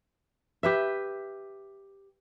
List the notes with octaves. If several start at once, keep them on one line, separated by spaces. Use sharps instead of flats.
G4 B4 E5